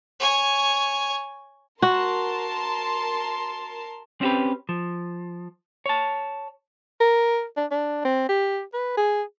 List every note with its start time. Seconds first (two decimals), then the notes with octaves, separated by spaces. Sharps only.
0.20 C#5 G#5
1.82 F#4 A#4 A5 C6
4.21 C4 C#4 F#4 G4 B4
4.69 F3
5.86 C#5 A5
7.00 A#4
7.57 D4
7.71 D4
8.05 C4
8.29 G4
8.73 B4
8.97 G#4